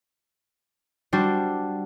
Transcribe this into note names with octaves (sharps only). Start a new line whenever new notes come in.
G3 D4 F#4 C5